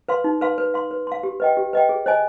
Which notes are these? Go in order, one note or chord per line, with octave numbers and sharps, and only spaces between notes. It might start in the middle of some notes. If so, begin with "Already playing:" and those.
B4 F5 C6
D#4
B4 F5 C6
B4
F5 C6
B4
F5 C6
G4
B4 D#5 G5
G4
B4 D#5 G5
G#4
C5 D#5 G#5